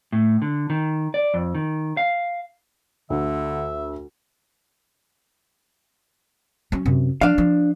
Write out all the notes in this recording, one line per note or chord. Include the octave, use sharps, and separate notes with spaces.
A2
D3
D#3
D5
F2
D#3
F5
D2 D3 E5
F#3 C#4
F#2 C3
F3 D4 F5
F3